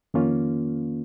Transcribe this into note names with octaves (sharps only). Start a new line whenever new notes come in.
F2 D#3 A#3 C#4 F4